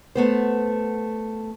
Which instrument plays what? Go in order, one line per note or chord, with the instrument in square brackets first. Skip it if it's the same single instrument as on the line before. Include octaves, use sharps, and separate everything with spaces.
[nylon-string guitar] A3 B3 C5